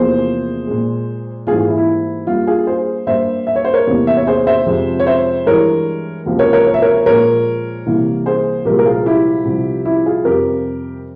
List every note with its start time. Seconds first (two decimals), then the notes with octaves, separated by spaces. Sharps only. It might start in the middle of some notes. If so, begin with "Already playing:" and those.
Already playing: E2 C3 F3 A#3 G#4 C5
0.67 A#2 G#3
1.47 G#2 E3 G3 A#3 F4 G#4
1.58 F4
1.68 E4
1.78 E4
2.27 G2 G3 A#3 F4
2.47 F4 G#4
2.67 G#4 C5
3.07 G2 G3 A#3 C5 E5
3.47 E5
3.56 C#5
3.65 C5
3.73 A#4 C#5
3.87 E2 C3 G3 A#3
4.07 E5
4.17 C#5
4.27 G#4 C5
4.47 C5 E5
4.66 F2 C3 F3 G#3
5.00 C#5
5.07 C5 E5
5.46 G2 E3 G#3 A#4 C#5
6.26 C#2 C3 F3 A#3
6.39 A#4 C#5
6.53 A#4 C#5
6.67 C#5
6.74 E5
6.82 A#4 C#5
7.06 A#2 F3 G#3 A#4 C#5
7.86 C2 C3 E3 A#3
8.26 G#4 C5
8.65 C2 A#2 F3 G#3 G4 A#4
8.79 A#4
8.86 F4 G#4
9.06 E4 G4
9.45 C2 C3 F3
9.85 E4 G4
10.06 F4 G#4
10.25 F2 C3 G3 G4 A#4